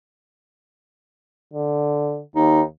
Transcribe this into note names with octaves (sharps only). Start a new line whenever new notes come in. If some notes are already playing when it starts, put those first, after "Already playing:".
D3
D#2 D#4